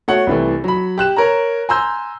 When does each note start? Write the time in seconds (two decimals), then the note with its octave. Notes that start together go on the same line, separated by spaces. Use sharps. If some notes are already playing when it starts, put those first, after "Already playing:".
0.08 A3 F#4 C#5 F#5
0.27 C2 E3 A3
0.64 F#3 B5
0.98 G4 F#6 E7
1.16 A#4 C#5 A#5
1.69 G#5 A#5 C6 E6 G6